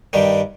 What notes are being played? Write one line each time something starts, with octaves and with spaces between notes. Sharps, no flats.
G2 D#3 G3